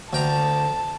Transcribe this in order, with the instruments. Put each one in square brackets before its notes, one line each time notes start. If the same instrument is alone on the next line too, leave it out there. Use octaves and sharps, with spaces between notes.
[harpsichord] D2 G5 A#5 [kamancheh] A5